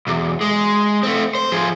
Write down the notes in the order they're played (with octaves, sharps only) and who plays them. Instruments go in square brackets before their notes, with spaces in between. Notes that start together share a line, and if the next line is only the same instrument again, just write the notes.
[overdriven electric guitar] B1 E2
G#3
A3 C4
C5
F3 G#4